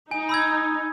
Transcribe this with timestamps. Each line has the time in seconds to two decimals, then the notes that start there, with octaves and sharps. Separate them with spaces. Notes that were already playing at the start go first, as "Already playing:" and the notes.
0.11 D#4 G#5
0.29 B5 E6 G#6